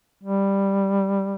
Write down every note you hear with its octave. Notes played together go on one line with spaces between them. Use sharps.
G3